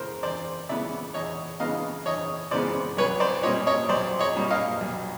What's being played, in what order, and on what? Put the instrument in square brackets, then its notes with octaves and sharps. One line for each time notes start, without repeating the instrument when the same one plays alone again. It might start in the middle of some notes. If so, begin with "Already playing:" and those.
Already playing: [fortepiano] C#3 E3 G#3 B3 A#4 C5
E2 C5 D5
C#3 E3 G#3 B3 D5 E5
E2 C#5 D#5
C#3 E3 G#3 B3 D#5 F5
E2 C#5 D#5
C#3 E3 G#3 B3 C5 D5
B1 B4 C#5
C5 D5
A#2 G3 A#3 C#5 D#5
C#5 D#5
B1 C5 D5
C#5 D#5
A#2 G3 A#3
D#5 F5
B1